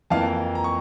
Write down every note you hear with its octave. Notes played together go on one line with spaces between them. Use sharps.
F2 E3 A#3 F5 A5
A#5
C#6